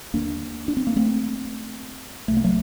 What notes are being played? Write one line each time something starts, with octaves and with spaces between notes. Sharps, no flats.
D#2 D3 A#3 D4
D4
C4
A#3
A3 C4
C2 C3 A3
A#3
F#3 A3